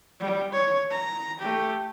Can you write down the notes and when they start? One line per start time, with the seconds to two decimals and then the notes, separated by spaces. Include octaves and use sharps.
0.20 G3
0.52 C#5
0.91 A#5
1.39 A3 G4